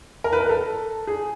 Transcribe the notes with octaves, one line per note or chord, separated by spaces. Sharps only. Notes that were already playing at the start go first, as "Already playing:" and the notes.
A#4
B4
A#4
A4
G#4